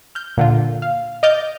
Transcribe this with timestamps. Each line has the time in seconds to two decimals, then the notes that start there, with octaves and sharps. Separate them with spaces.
0.15 F6 G6
0.37 A#2 D3 F4
0.82 F5
1.23 D#5 D6 F6 G6 A6